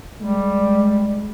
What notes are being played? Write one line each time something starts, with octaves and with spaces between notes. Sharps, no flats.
G3 G#3